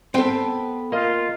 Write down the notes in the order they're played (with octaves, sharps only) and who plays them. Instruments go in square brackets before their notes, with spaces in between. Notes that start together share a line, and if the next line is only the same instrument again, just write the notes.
[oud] B3 A4 [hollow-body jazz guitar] C4 C5 G5
[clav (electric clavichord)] A#3 D#5 [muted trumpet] F4